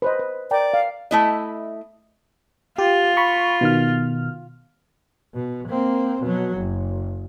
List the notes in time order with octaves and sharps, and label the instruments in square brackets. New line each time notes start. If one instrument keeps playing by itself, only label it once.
[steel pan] B4 C5 D#5
B4
[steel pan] A#4 G5 A#5 [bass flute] D5
[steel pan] F5
[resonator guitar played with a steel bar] A3 E4 D#5
[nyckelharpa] F4 [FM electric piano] G4
[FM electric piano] B5 C#6
B2 D#3 F6
[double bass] B2
A#3 C4
B2 F#3
F#1